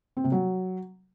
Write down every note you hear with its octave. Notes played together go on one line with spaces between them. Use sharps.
C4
C3
F#3